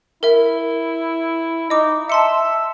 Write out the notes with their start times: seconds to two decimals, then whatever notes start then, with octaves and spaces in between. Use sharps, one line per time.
0.23 E4 A#4 E5
1.70 D#4 D#5 D6
2.10 E5 A5 C6 C#7